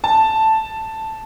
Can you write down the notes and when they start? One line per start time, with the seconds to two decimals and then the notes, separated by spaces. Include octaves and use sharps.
0.04 A5